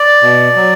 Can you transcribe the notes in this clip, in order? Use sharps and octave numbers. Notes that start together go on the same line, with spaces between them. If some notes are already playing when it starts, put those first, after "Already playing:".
Already playing: D5
B2
F#3